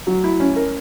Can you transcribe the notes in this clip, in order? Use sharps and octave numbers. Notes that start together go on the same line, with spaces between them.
F#3
E4
C#4
A#4